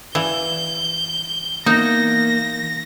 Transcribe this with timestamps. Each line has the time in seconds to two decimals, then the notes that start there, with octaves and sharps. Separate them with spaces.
0.15 E3 D5 F5 G#5 G6
1.66 E3 A#3 B3 D#4 A#6